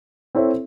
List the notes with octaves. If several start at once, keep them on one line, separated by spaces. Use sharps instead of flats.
C4 E4 A4 C#5 E5